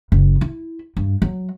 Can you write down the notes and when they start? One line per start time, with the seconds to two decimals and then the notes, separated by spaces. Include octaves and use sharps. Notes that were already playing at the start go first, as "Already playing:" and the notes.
0.12 F#1
0.41 E4
0.97 G2
1.22 F#3